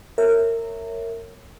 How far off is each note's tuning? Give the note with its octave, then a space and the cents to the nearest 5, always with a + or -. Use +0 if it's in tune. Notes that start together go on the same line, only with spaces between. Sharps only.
A#4 -25 C#5 -5 E5 +0